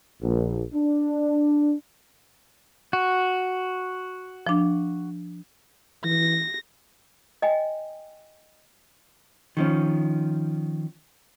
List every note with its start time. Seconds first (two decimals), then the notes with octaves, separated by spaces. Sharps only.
0.22 A#1
0.74 D4
2.93 F#4
4.47 F3 D4
6.05 E3 A#6
7.42 D#5 G5 G#5
9.57 D#3 F3 C#4